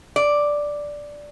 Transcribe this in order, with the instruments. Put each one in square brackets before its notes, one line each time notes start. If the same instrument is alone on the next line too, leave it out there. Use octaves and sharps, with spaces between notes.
[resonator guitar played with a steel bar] D5